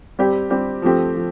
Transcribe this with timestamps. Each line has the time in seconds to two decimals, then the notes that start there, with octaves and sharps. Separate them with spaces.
0.19 G3 C4 G4
0.50 G3 C4 G4
0.82 F3 A3 C4 G4
1.14 F3